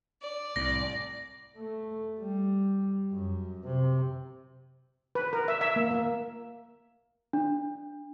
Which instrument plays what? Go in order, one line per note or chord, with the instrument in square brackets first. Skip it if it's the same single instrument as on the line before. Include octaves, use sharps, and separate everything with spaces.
[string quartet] D5
[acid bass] C2 [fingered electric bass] A2 C3 G3 [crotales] A#6
[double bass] A3
G3
F#2
C3
[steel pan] B4
A#4
E5
E5
A#3
A#3
[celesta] D4